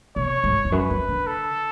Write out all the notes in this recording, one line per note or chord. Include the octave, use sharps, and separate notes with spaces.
B2 C#5
G#2
E2
F#2 B4
F#2
D3
A4